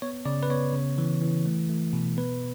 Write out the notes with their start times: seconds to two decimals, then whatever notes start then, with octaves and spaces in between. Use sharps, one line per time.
0.02 B3 C#5
0.26 C#3 D5
0.43 B4
0.50 B3 C#5
0.73 C#3
0.98 E3
1.22 E3
1.45 A3
1.70 A3
1.93 B2
2.17 B3 B4